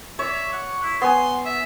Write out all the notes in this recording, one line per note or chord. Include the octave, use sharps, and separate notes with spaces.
C#5 D5 E5
F#5
E4
B3 G#5 C6
E5